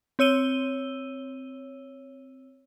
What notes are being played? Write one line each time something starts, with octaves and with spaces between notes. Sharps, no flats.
C4 C#5 E6 D#7 G7